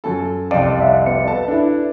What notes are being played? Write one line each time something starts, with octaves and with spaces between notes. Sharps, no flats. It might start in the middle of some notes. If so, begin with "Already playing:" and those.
F#2 A4
C2 F2 D5
E5 F#5
B3 C#7
A4 B4 A5
D4 E4 A4